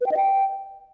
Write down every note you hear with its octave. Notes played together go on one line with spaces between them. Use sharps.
B4
G5
D#5
G5